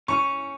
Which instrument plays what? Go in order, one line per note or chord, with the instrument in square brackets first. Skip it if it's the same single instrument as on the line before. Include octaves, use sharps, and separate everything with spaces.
[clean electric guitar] C#4 [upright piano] C#6